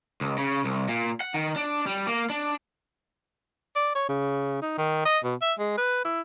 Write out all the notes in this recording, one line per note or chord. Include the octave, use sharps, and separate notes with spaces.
C#2
C#3
C2
A#2
F#5
D#3
D4
G3
A#3
D4
D5
C#5
C#3
D#4
D#3
D#5
B2
E5
G#3
B4
E4